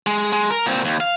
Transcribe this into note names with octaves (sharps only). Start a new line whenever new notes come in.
G#3
G#3
A#4
A#2 C4
D#2
F5